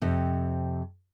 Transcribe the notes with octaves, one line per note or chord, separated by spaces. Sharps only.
F2 C3